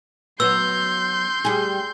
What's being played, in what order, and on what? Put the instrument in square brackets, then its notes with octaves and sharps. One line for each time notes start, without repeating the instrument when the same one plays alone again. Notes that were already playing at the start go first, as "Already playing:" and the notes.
[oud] F#3 B3 [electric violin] C6 G6 [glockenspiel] E6
[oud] G3 G#4